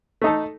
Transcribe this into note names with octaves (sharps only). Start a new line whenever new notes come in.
A3 D#4 A4